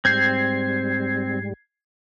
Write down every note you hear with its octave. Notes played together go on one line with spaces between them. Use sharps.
G#2 G3 C4 G6 G#6 C7